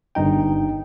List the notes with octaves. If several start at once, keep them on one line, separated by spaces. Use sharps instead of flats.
G1 G2 D#4 G5